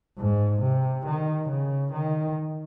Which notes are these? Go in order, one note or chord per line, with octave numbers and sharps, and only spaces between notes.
G#2
C3
D#3
C#3
D#3